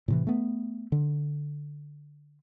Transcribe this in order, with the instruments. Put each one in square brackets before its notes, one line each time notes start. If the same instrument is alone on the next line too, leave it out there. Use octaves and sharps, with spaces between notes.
[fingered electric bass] A2 C3 E3
A3 B3
D3